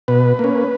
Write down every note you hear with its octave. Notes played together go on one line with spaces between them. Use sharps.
B2 B4
A#3 C#4